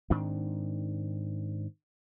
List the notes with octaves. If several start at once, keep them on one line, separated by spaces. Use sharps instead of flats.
G#2 D#3 C4 D4